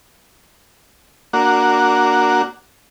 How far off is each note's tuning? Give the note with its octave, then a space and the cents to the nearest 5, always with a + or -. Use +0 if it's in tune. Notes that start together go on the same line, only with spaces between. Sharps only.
A#3 +0 D4 -5 F#4 +0